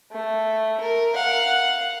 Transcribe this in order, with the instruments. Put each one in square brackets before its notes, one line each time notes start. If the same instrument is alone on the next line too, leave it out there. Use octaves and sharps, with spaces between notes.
[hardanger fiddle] A3
A#4
F5 F#5